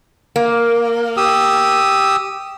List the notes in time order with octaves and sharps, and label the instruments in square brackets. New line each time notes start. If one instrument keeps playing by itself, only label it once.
[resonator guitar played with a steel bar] A#3
[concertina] G4 D#6 E6